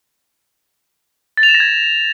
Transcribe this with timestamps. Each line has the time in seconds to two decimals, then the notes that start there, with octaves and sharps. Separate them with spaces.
1.37 A6
1.43 F7
1.49 E7
1.55 A#6
1.60 G#6